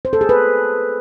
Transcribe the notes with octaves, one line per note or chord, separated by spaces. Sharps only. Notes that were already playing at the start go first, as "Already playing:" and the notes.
C5
A4
G#4
B4